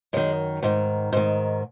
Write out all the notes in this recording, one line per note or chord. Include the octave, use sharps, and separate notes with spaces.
F#2 D#3 G#3
G#2 D#3
G#2 D#3